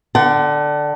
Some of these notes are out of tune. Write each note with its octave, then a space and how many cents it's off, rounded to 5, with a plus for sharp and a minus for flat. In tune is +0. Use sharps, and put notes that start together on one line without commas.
D3 +0 F#5 +40